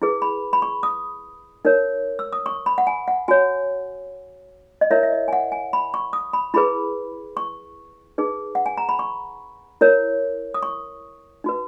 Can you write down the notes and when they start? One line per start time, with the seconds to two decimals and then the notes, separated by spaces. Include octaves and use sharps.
0.02 E4 G#4 B4
0.22 B5
0.53 B5
0.62 C#6
0.83 D#6
1.65 D#4 A#4 C#5
2.19 E6
2.33 D#6
2.46 C#6
2.66 B5
2.78 F#5
2.87 G#5
3.08 F#5
3.28 F#4 C#5 G#5
4.81 D#5
4.91 E4 A#4 C#5 E5
5.03 E5
5.12 D#5
5.28 G#5
5.33 F#5
5.52 G#5
5.73 B5
5.94 C#6
6.13 D#6
6.33 B5
6.54 E4 G#4 B4 B5
7.37 C#6
8.18 D#4 G#4 B4
8.55 F#5
8.66 G#5
8.78 A#5
8.89 B5
8.99 C#6
9.81 E4 A#4 C#5
10.54 D#6
10.63 C#6
11.44 D#4 F#4 B4